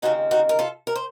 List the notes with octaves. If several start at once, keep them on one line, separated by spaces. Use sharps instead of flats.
D#2 C#3 F3 C4 D#4 F#4
D#4 F#4
A#4
F4 A4
A#4
C5